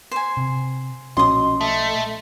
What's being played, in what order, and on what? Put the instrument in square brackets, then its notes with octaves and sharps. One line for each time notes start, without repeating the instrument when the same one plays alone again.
[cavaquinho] C5 G#5
[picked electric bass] C3
[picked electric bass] B1 A#2 F3 [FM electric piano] C#4 F#4 D#5 [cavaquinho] C6 D#6
[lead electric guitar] A3 [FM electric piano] D#5